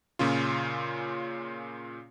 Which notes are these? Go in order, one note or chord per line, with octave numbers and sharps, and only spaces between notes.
A#2 C#3 C#4 F4